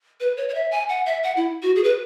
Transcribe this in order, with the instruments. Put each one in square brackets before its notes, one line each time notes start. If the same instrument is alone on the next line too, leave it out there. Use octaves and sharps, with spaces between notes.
[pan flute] B4
C#5
C#5
E5
G#5
F#5
E5
F#5
E4
F#4
G#4
B4